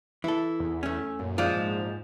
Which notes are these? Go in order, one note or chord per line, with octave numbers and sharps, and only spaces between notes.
E3 E4 A4
E2
A3 C#4
F#2 A#2
F3 G#3 D5
G#2